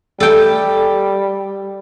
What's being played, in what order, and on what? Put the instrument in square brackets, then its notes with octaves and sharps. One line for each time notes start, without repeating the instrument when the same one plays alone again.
[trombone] G3 [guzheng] A4 G5